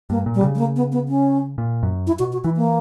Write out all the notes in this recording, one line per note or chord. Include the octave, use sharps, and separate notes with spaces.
G2 A#3
A#2
G3
C#3
G3
A#3
B3
B3
C#4
A#2
F#2
E4
B2 F#4
F#4
E3 E4
A#3